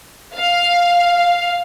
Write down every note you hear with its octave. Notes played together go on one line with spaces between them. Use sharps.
F5